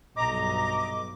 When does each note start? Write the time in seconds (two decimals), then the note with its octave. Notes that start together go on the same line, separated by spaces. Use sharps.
0.16 B1 G2 D#5 A#5 D6